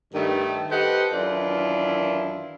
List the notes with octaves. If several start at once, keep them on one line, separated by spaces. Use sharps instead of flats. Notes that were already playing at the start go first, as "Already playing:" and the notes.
G2 D#3 A3
G4 A4 B4 C5 D#5 F#5
F#2 D#3 E3 D4 E4 F4